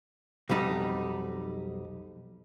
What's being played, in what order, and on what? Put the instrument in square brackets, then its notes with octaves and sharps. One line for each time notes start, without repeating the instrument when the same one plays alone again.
[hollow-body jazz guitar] B1 F2 G3 D#4